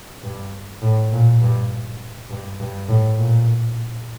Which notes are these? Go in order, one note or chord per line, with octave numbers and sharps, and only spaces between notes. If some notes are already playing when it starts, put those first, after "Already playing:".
G2
A2
A#2
G2
G2
G2
A2
A#2